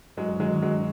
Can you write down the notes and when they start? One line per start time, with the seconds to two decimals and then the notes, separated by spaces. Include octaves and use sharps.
0.17 G2 F#3 G#3
0.40 D#3 F#3 G#3
0.62 G2 F#3 G#3